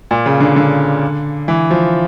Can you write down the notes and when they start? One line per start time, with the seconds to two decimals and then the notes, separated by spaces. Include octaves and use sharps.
0.11 A#2
0.26 C#3
0.40 D3
0.56 D3
1.48 E3
1.71 F3